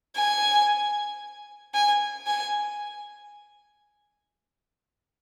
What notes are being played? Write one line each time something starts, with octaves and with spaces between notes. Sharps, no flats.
G#5
G#5
G#5